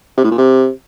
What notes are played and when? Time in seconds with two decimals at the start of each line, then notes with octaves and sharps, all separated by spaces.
0.17 C3
0.24 A2
0.31 A#2
0.38 C3